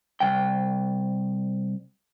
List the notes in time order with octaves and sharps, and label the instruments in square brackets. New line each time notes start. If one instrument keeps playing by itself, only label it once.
[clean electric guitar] C2 G5